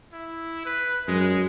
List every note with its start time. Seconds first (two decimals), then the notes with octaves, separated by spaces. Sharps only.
0.13 E4
0.66 B4
1.08 F#2 G#3